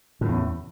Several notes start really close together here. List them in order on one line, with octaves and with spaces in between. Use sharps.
A2 C#3 E2